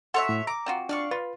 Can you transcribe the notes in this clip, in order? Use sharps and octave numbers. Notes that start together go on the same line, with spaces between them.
F#4 A4 C#5 E5 F#5 C6
A2
A#5 D6
C4 F4 F#4
D4 D5 F5 C#6
F4 B4